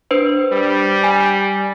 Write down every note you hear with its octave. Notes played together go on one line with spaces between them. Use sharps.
D4 B4 C5
G3
G#5